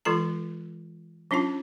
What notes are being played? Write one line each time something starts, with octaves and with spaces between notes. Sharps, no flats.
E3 G#3 F4 A4 A#5
F#3 C#4 D4 F4 A5